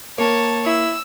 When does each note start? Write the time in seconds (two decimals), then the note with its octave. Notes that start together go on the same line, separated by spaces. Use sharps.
0.18 A#3 C#5 A5
0.67 E4 E6